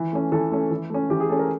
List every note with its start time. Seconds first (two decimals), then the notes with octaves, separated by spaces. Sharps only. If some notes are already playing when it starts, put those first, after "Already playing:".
Already playing: E3
0.13 A3 C#4
0.32 E3 A4
0.51 A3 C#4
0.71 E3
0.90 A3 C#4
1.10 E3 G4
1.20 G#4
1.29 A3 C#4 A4
1.39 A#4